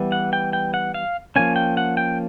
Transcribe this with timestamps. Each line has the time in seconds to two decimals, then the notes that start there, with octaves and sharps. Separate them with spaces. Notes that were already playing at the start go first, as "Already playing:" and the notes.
Already playing: E3 G3 B3
0.12 F#5
0.33 G5
0.53 G5
0.74 F#5
0.94 F5
1.36 F3 A#3 C#4 G#5
1.56 G5
1.77 F#5
1.97 G5